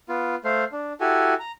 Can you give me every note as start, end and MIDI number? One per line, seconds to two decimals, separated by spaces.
0.09 0.36 59
0.09 0.36 65
0.45 0.64 57
0.45 0.64 72
0.45 0.64 77
0.72 0.93 62
1.00 1.34 64
1.00 1.34 66
1.00 1.34 67
1.00 1.34 69
1.00 1.34 80
1.40 1.52 82